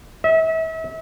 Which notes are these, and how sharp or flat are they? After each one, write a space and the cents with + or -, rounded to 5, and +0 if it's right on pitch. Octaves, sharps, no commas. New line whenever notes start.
E5 -35